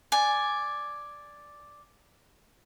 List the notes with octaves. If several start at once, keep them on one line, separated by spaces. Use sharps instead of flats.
D5 G#5